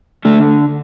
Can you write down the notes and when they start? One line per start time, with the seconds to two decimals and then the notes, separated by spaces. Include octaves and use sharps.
0.25 D3 A3